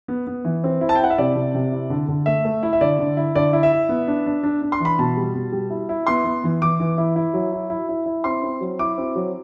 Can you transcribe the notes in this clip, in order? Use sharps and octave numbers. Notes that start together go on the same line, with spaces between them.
B3
B3
E3
C4
E4
A5
G5
E4 F#5
E5
C3 D5
C3
C3
E4
D3
D3
A3 E5
A3
E4
E5
D3 D5
D3
E4
D3 D5
E4
E5
E4
B3
D4
D4
D4
D4
C6
E3 B5
B2 A5
G3
B2
G3
E4
E4
B3 C6
B3
E3
E3 D6
E3
E4
E4
F#3
E4
E4
E4
E4
C4 C6
C4
F#3
E4 D6
C4
F#3